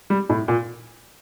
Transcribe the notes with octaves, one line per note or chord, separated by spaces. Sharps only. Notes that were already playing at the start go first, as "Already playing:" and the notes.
G3
A2
A#2